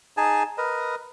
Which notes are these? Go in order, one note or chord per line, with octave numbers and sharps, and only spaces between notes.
D#4 G#4 G#5 A5
A#4 B4 D#5